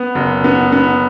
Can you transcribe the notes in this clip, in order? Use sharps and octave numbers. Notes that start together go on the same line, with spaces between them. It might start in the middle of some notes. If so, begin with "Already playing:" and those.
Already playing: B3
F#1
B3
B3